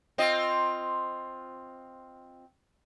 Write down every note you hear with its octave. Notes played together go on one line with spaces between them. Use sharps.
C4 F4 D#5